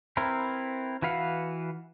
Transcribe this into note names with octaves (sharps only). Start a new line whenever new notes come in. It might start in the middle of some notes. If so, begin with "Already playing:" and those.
C4 E4 A#4 B4
E3 F#4 B4 F5 F#5